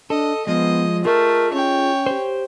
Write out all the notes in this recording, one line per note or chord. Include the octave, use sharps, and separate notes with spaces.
D4 A4 D#5
F3 G#3 B3 D#5
A3 F4 G#4 A#4 D#5
C#4 C#5 G5
G4 C5